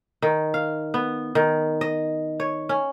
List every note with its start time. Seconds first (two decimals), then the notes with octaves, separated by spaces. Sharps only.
0.22 D#3
0.54 F5
0.94 B3
1.35 D#3
1.81 D#5
2.40 C#5
2.69 C#4